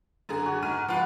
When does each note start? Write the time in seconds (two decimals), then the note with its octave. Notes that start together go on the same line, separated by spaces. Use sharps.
0.29 F#2 D3 G#4
0.46 F#4 G#5
0.62 G#2 F6 D#7
0.88 F3 F4 B4 F#5 B5